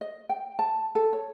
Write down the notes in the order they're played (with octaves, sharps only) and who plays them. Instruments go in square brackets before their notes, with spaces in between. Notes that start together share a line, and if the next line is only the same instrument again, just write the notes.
[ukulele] D#5
G5
A5
A4
C#5